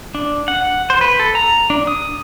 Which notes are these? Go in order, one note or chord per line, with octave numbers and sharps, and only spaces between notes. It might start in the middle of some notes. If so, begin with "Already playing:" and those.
D4
F#5
C5
B4
A4
A#5
D4
D#6